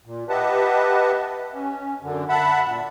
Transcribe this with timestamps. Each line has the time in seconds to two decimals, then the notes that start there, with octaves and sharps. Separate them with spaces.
0.06 A#2
0.29 G4 B4 D#5 E5 F#5 A5
1.54 C#4
2.02 F#2 D3
2.29 E5 F#5 A5 B5
2.66 A#2